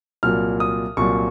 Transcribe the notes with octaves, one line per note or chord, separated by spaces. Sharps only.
C2 A#2 F#3 F6
D#6
C2 A#2 F#3 C#6